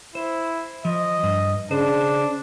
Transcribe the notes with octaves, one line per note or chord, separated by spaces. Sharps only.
E4 C5
F3 D#5
G2
C#3 D4 C5